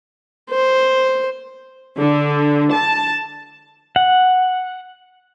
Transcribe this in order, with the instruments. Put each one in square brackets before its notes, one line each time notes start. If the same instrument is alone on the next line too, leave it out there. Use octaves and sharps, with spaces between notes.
[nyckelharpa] C5
[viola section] D3
A5
[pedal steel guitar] F#5